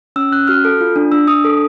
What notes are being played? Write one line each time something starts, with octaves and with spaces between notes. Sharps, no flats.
C#4 E6
C#4 F#6
F#4 F6
A4
F4
D4
D4 E6
D4 D#6
A4